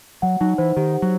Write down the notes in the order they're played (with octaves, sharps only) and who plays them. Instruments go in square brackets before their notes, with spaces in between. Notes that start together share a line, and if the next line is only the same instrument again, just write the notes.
[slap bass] F#3 [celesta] F#5
[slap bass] F#3 [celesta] D#4
[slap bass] E3 [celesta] C5
[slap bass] D#3 [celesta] G4
[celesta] F#5
[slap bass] F#3